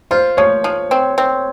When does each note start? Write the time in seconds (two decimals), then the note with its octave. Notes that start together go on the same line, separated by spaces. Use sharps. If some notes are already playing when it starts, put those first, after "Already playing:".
0.11 F4 C5
0.37 F3 C#5
0.64 F3
0.91 C4
1.18 C4